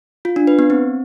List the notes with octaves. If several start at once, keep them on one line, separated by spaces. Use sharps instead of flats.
F4
D4
B4
B3
C4